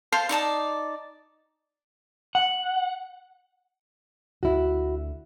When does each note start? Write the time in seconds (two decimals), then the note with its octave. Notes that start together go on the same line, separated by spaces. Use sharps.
0.12 C5 F5 A5 C6
0.29 D#4 D5 A5 D#6
2.35 F#5
4.43 D2 E4 F#4